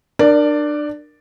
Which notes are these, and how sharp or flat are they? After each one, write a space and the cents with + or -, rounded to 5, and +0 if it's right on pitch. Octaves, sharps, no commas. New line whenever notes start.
D4 +30 A#4 +5 D5 +0